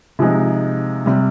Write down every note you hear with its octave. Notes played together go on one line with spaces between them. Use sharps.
C3 F3 G#3 D#4
C3 G3